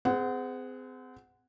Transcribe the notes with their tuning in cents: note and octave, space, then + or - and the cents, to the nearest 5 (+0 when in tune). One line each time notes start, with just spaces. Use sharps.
C4 -35 G#4 +0 F#5 +0